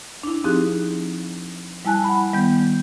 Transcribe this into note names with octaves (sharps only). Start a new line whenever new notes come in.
D4 E4
F3 C4 D#4 G4 G#4 F#6
G3 E4 G#5 A5 F#6
F#5 B5
D#3 G3 B3 G6